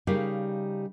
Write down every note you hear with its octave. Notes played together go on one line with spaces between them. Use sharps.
C#3 G3 D#4 G4 A#4 F5